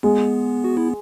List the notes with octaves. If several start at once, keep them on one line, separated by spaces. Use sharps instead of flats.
G#3 B3
F#4
E4